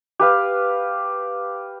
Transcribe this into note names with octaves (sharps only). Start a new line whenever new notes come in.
G4 B4 F5